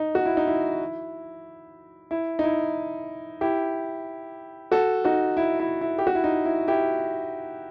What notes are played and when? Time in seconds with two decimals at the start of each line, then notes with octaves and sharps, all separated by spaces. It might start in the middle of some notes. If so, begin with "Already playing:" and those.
Already playing: D#4
0.15 F#4
0.26 E4
0.37 D#4
0.48 E4
2.11 E4
2.39 D#4
2.44 E4
3.41 E4 G4
4.72 F#4 A4
5.04 D#4 F#4
5.37 E4
5.60 E4
5.81 E4
5.98 G4
6.07 F#4
6.15 E4
6.24 D#4
6.45 E4
6.68 E4 G4